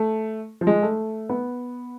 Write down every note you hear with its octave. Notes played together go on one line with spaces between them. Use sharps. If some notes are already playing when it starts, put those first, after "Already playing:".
Already playing: A3
F3
G#3
A3
B3